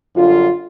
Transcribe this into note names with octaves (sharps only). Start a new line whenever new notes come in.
F#2 D3 G3 F4